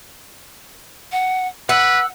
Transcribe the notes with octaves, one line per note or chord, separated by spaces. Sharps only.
F#5
B4 F#5 E6